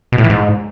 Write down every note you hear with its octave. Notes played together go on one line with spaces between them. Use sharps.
B2
A2
E3
G#2